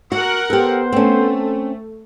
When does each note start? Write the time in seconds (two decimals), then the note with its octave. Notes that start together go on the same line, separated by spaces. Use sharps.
0.12 F#4 A#4 F#5
0.50 B3 G4 A4 C5
0.92 A3 C4 C#4